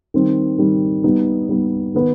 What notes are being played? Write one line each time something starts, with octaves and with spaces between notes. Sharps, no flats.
D#3 G3 C4
D#3 G3 C4
G3 B3 D#4
G3 B3 D#4
D#3 B3 D#4 B4